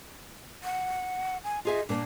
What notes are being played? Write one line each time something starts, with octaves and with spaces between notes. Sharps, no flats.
F#5
G#5
F4 G#4 D#5 E5
A#2 A#3 D4